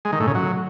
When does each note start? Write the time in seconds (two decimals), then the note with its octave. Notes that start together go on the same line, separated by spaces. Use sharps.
0.05 G#3
0.12 D#3
0.20 A2
0.27 C#3
0.35 F#3